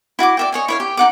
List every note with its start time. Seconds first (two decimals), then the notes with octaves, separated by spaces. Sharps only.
0.19 E4 F#4 A5 D6
0.37 D5 E5 G5
0.52 C#5 D#5 G#5
0.68 E4 C#5 F5
0.80 G4
0.97 D#4 F#5 D6